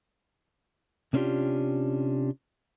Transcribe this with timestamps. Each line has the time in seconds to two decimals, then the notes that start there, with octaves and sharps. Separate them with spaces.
1.13 C3 A#3 C#4 D4 F4 G4